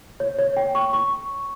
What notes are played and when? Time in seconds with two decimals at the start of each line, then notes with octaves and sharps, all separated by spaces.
0.20 C#5
0.39 C#5
0.57 G5
0.75 C#6
0.93 C#6